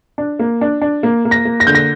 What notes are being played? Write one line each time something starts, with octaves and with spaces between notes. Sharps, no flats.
D4
A#3
D4
D4
A#3
A#3
A#6
A#3
A#6
D3 G6
A#6